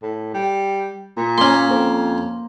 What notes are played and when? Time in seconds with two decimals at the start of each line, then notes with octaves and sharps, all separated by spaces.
0.02 A2
0.34 G3
1.17 A#2
1.38 A#3 C#4 C6
1.70 F2 C5